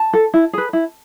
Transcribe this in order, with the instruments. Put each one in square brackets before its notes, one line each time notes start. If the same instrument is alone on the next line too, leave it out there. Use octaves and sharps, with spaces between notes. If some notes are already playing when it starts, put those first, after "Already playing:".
Already playing: [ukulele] A5
A4
E4
G#4 B4
E4